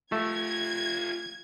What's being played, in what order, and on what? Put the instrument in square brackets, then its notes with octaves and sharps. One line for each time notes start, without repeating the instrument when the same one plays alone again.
[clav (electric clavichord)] A3 E5 [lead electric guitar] F4 G4 [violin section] G#6